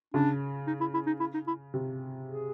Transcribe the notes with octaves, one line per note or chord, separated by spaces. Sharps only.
C#3 D4
D#4
E4
E4
D#4
E4
D#4
E4
C3
G#4